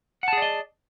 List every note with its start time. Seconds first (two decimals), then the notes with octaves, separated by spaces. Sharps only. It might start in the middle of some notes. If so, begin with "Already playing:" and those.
0.23 F#5
0.28 A5
0.33 G#4
0.37 D5
0.42 D#5